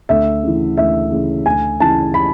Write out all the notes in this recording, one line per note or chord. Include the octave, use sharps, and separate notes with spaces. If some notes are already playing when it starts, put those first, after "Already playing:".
D2 E5
C#3 E3
D2 E5
C#3 E3
D2 G#5
C#3 E3 A5
B5